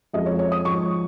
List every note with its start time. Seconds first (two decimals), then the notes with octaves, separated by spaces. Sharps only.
0.13 F2 F3 G#3 D#5
0.26 C#5
0.39 C#5
0.52 D#6
0.65 G#2 F3 G#3 C#6